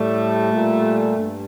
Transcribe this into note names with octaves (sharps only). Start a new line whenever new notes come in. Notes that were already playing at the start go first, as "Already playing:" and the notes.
Already playing: A2 G3 A3
A#2 G3
G2